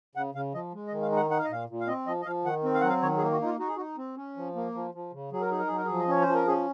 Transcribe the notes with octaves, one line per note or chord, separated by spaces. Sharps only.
C#3 F#5
C#3 F5
F3 D#5
G#3
D#5
D#3
F5
D#4 F#5
D#4 F#5
F5
D#5
A#2 F5
A#2
F5
C4 D#5
F3 D#5
D#5
F3 F5
D#3 F#5
C4
F5
F#5
F#3
F5
D#3 C#5
G#4
A#3
F#4
D#4 F4
D#4 F#4
G#4
D#4 F#4
C4
C#4
F3
A#3
F3
F3
C#3
F#3 G#4
A#4
D#4 G#4
A#4
F#3 G#4
A#4
F3 G#4
D#5
C#4 C#5
C5
F3
A#4
C#4 G#4